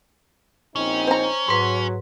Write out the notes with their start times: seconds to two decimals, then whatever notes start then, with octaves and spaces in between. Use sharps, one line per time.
0.76 A#1 C4 C#4 D#4
1.07 C5 A#5
1.48 G#2 F#3 B4